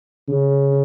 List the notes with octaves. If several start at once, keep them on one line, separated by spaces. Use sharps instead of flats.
C#3